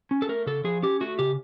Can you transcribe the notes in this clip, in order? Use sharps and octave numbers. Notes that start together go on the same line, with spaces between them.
C#4
A4
A3 A#4
C#3 A4
F3 G#4
C#4 G4
A3 F#4
C#3 G4